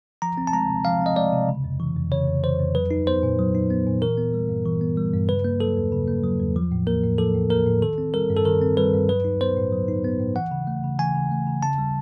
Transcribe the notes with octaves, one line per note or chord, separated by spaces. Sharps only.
F3 A#5
C4
A5
G#3 A#5
C3
F3 F5
C4 D#5
G#3 D5
C3
C#3
F2
E3
F2
C#3 C#5
F2
E3 C5
F2
F#3 B4
D#4
B3 C5
A#2
F#3
D#4
B3
A#2
E3 A#4
B3
G3
G2
E3
B3
G3
G2
C#3 B4
A#3
F#3 A4
E2
C#3
A#3
F#3
E2
F3
A2
A#3 A#4
A2
F3 A4
A2
A#3 A#4
A2
D#3 A4
C4
G3 A#4
G2
A4
D#3 A#4
C4
G3 B4
G2
F#3 B4
D#4
B3 C5
A2
F#3
D#4
B3
A2
E3 F#5
C#3
A3
C#3
E3 G#5
C#3
A3
C#3
C#3 A5
G3